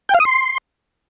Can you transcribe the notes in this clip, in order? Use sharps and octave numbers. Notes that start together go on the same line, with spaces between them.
G5
F5
D#6
C6